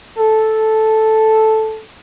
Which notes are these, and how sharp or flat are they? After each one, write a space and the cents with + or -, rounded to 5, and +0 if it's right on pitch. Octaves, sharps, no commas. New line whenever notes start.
A4 -5